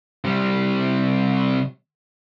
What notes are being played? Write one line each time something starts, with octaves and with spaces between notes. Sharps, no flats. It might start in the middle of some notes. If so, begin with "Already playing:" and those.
C3 G3